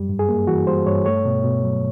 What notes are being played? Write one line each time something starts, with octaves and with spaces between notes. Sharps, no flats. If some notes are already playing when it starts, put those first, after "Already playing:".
Already playing: F#2 G3
G2
G#4
A#3
E3 F#4
G3 C5
G2 C#5
A3 C#5
B2
B2
F#3